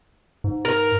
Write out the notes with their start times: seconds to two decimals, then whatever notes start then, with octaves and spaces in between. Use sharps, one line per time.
0.44 G#2
0.65 A#4